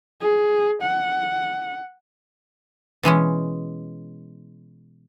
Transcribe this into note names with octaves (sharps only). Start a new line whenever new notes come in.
G#4
F#5
B2 E3 G#3 C#4